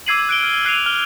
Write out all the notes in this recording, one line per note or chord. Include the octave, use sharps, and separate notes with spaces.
D6 E6 G#6 C7 D#7 F#7
F#6 D7 G7
F6 G7
E6 F#6 C7 D7 D#7 F7
F6 G7